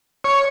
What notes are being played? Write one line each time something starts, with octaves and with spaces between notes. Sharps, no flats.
C#5